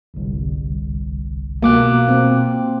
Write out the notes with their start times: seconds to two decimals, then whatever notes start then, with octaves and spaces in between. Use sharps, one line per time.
0.14 G1 C2
1.63 B2 A#3 D6 F#6
2.08 C4